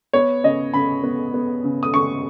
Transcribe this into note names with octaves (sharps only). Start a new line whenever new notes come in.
B3 C#5
C#3 D#5
C#3 B5
B3
B3
C#3
D#6
C#3 C#6